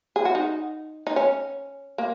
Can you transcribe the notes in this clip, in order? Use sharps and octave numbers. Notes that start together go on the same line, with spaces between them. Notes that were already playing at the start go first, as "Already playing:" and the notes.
G#4
F#4
D#4
D#4
C#4
A#3